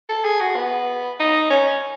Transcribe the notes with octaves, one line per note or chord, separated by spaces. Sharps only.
A4
G#4
F#4
B3
D#4
C#4